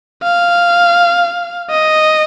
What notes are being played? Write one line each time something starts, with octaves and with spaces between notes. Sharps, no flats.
F5
D#5